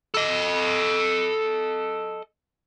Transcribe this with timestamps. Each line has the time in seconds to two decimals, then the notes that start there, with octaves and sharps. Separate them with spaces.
0.14 A4 D#5